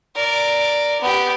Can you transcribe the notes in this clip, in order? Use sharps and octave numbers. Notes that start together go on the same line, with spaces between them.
A#4 D5
B3 G4